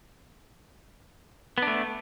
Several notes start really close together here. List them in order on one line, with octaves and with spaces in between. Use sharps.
B3 D4 A3